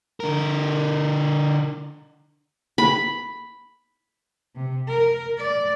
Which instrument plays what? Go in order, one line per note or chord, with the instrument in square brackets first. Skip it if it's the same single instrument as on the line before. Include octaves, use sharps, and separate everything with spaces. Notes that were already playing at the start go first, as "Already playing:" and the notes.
[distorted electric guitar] D3 A#4
[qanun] B5
[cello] C3
A#4
D5